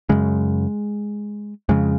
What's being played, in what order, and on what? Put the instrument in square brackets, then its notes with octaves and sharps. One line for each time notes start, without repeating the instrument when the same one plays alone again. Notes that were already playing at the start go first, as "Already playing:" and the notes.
[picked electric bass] F#2 C#3 G#3
F2 C#3 G#3